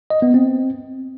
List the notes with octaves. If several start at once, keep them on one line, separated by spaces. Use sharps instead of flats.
D#5
B3
C4